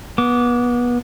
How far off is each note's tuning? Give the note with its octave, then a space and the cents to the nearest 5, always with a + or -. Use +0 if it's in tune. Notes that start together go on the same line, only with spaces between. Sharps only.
B3 -25 D6 -25